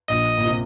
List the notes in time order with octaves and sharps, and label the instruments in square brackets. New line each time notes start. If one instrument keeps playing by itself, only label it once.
[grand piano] A#1 A#2 [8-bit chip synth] D#5
[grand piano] A#2
C3